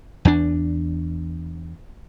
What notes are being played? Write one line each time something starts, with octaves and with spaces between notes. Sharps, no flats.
E2 D4